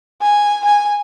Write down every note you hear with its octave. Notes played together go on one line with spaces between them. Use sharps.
G#5
G#5